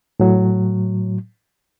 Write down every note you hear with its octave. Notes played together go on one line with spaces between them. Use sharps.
A2 F#3